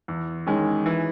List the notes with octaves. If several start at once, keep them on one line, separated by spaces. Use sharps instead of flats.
E2
D#3 G#3 C#4
E3